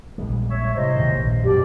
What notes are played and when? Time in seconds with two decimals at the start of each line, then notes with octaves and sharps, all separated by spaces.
0.18 A#1 G3 G#3
0.50 C#5 E5
0.75 A2 C3 C5 D#5
0.95 D#2 G#2 D#3
1.16 A#1 G2
1.44 F#2 B2 G4 D5